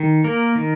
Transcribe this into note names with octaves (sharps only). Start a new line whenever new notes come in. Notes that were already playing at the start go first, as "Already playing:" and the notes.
Already playing: D#3
A#3 A#4
D#3